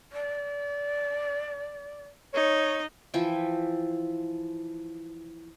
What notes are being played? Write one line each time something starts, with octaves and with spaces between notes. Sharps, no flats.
D5
D#4 C#5
E3 F3 E4 G5